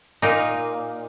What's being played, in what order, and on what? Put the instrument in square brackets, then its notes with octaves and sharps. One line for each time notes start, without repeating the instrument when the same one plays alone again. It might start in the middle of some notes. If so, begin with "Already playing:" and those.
[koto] A#2 D#4